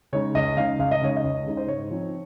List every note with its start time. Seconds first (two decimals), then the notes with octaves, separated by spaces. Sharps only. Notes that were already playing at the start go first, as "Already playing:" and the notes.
0.13 C#3 G#3 D#4 C#5
0.35 C#2 D#5
0.57 C#3 G#3 D#4 F5
0.79 C#2 F5
0.91 D#5
1.02 C#3 G#3 D#4 C#5
1.17 D#5
1.24 C#2
1.46 C#3 G#3 D#4
1.57 C5
1.68 G#2 C#5
1.91 F3 C4 D#4